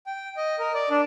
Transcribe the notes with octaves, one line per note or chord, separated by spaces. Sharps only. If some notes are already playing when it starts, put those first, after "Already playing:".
G5
D#5
A#4
D5
D4